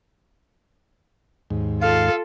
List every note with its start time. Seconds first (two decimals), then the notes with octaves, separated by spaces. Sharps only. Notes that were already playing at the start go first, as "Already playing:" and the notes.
1.50 D#2 G#2
1.81 F4 A4 F5